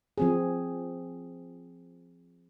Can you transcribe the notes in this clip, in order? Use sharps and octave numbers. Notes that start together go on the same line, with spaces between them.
F3 C4 G#4